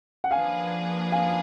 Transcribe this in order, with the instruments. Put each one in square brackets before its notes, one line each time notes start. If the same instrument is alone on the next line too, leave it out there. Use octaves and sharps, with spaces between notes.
[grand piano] F#5
[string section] F3 A#3 D4 G#4 B4 [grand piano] F5 G#5
[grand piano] F5 G#5